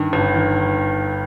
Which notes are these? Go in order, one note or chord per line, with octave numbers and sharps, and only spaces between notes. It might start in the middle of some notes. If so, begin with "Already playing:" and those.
Already playing: G2 D#3
G1
D#3